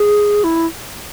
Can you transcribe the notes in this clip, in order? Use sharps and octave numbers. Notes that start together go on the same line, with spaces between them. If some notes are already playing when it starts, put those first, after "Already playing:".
Already playing: G#4
E4